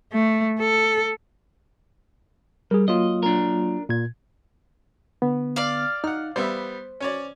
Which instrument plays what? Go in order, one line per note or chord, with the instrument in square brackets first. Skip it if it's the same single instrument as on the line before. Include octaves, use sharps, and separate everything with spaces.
[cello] A3
A4
[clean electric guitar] G3 [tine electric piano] G#4 A#4
[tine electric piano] F#3 A#3 F4 [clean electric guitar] D#5
[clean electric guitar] D4 A#4
[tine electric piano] A#2 G#6
[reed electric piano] D3 B3
[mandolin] D5 F5
[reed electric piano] D#4 [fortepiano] F#5 F6
[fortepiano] G3 B3 E5 [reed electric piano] C5
[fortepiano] C#4 C#5 D5